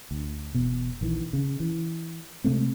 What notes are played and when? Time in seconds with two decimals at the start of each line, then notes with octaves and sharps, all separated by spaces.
0.11 D2
0.55 E1 B2
1.01 A#1 D#3 E3
1.33 C#3
1.60 E3
2.44 C3 G#3 A3 C4